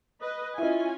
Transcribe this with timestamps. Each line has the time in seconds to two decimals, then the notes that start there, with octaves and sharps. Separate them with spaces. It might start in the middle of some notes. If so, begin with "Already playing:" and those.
0.22 B4 D#5
0.58 C#4 E4 F4 D#5 G#5